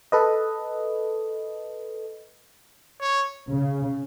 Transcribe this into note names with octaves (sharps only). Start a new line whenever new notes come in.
A4 B4 D#5
C#5
C#3